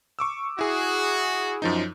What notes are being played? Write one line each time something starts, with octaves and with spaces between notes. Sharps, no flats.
C#6 D6 E6
E4 F#4 G#4
F#2 F3 D#4